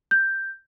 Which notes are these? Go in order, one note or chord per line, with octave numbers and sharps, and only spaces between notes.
G6